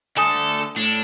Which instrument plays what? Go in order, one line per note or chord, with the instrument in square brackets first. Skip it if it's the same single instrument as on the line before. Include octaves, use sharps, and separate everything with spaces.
[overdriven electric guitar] D3 A3 [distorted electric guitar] A4 [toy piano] G#5 D#6
[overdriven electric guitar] A2 [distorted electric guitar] D4